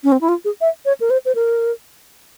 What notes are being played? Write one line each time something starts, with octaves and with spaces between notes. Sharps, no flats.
C#4
C4
E4
F4
G#4
E5
C#5
A#4
C5
C5
A#4